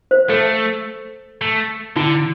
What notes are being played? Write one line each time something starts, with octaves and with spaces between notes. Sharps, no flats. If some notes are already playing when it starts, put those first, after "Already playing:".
C5
A3 A4
A3
D3 E4